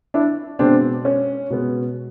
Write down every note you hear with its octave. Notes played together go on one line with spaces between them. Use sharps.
D4 E4
B2 G#3 B3 C4 D4
C#4
B2 G#3 B3